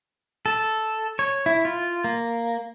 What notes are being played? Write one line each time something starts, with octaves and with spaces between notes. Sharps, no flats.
A4
C#5
E4
F4
A#3